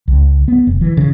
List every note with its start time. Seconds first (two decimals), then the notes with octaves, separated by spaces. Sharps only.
0.08 C#2
0.48 B3
0.67 F1
0.81 E3
0.97 C#3